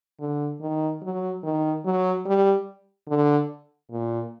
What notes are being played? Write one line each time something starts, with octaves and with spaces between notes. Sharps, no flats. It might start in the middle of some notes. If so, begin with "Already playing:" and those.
D3
D#3
F#3
D#3
F#3
G3
D3
A#2